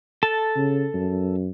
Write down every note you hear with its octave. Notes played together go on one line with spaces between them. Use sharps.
A4 A5
C#3
F#2